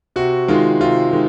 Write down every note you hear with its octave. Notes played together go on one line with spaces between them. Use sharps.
C3 F#4
D#3 G#3 F4
C3 F4
D#3 G#3